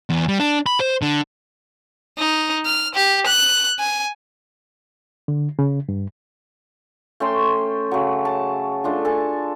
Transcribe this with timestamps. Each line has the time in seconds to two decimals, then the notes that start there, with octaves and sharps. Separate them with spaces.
0.10 E2
0.28 G3
0.39 D4
0.66 B5
0.80 C5
1.02 D3
2.18 D#4
2.65 F6
2.95 G4
3.27 F#6
3.79 G#5
5.28 D3
5.59 C#3
5.89 G2
7.20 A3 C#4 G5 C6
7.91 C#3 F#3
8.25 A5
8.84 A3 D4 F4
9.05 A4 G#5 A5